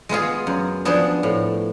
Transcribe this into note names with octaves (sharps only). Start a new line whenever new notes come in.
G#3 B3 F4 G#4
F#2
F3 B3 D4 G#4
A2